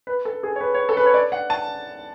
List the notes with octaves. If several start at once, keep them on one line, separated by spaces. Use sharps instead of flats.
B4
A4
G#4
C#5
B4
C#5
A4
B4
C#5
D5
F#5
A5